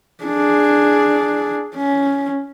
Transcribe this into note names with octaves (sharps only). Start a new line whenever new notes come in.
D4 G#4
C#4